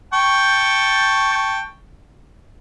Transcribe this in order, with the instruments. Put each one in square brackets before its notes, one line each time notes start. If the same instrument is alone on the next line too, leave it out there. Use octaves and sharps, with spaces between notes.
[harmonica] G5 A5 C#6